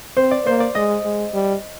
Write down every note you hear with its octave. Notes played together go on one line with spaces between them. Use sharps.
C4 C5
D5
A#3 C5
D5
G#3 D#5
G#3
G3